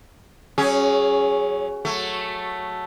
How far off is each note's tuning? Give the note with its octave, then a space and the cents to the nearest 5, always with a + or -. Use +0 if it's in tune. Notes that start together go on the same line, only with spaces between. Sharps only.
F#3 +25 C#4 -5 G#4 +0
F#3 -5 A3 +0